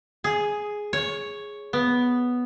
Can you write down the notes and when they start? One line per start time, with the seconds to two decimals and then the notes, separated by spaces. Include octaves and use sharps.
0.24 G#4
0.93 C#5
1.73 B3